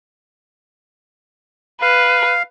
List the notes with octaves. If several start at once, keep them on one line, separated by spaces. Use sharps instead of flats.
B4 F5